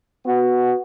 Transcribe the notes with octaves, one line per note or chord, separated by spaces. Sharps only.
B3 F#4